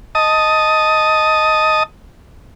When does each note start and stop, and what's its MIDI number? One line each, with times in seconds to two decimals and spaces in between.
0.15 1.83 75
0.15 1.83 81
0.15 1.83 87